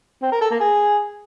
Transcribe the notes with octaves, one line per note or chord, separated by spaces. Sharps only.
C4
A#4
A4
A#3
G#4